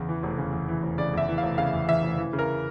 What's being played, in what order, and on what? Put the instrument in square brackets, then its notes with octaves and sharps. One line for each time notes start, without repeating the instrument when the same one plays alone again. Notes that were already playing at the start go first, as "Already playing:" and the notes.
Already playing: [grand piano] E2 C#3
E3
F1
C#3
E2
E3
F1
C#3 D5
E2 E5
E3
F5
F1
C#3 F5
E2
E3 E5
F1
E3
C#3
A#4